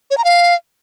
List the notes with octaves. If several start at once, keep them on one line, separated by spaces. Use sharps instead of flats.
C#5
A#5
F5